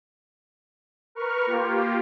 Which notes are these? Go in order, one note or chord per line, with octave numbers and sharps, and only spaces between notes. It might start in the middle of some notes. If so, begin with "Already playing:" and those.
A#4 B4 C#6 F6
A#3 F4 G4